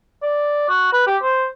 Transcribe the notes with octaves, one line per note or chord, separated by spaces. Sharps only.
D5
F#4
B4
G4
C5